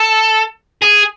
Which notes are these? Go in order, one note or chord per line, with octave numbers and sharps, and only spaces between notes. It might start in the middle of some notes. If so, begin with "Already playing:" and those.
Already playing: A4
G#4